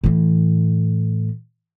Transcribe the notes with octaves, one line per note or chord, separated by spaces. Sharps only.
A2 E3